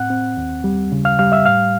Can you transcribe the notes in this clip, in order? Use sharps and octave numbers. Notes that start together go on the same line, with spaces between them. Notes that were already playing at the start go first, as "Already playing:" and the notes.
Already playing: A2 C4 F#5 F#6
C4
D#2
G3
C#3
F5 F6
G3 F5 F6
E5 E6
A2 F5 F6